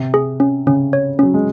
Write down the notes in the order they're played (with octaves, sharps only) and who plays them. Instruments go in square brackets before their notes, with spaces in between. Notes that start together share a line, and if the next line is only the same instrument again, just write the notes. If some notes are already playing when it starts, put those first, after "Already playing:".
Already playing: [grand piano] C3
[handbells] G#4
C#4
[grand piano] C#3 [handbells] C#4
[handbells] C#5
[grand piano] F#3 [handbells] C#4
[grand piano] G#3